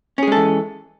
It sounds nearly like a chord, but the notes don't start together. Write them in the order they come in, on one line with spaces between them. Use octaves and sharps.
C#4 G#4 G#3 A4 E3